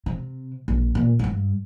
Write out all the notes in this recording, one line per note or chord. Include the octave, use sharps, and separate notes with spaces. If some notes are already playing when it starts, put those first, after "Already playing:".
C3
A#1
A#2
G2 D#4